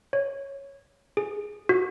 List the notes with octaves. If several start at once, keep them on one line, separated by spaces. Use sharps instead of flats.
C#5
G#4
F#4